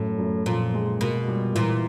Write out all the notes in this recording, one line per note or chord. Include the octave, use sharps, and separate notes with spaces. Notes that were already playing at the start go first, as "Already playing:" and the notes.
Already playing: F#2 A2
F#2
A#2 F3
G#3
B2 A#3
G3
A#2 E3